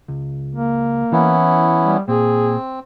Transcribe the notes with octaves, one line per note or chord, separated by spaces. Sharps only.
C#2
A#3
E3 B3 C#4 E4
G3
A#2 C4 G#4